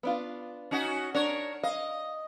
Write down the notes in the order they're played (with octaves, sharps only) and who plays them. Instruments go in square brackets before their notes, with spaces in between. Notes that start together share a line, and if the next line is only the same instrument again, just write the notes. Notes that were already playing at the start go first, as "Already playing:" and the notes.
[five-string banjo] B3 D4 F4
[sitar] C#4 D#4 F#4
[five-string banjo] D4 [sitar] A#4 C#5
[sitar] D#5 [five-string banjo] F5